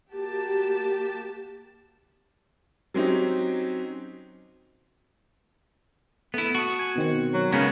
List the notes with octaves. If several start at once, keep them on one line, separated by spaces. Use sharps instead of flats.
A#3 F#4 G4 A5
F#3 C4 C#4 D#4 G4
A3 B3 E4
F#4 A5 C#6 D#6
G#5
B2 D#3 C4
F#3
C#3 G#3 B3 F#4 A#4 F5